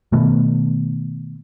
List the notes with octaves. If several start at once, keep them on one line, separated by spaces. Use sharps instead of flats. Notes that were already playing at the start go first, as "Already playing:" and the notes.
B2 D#3 A3 B3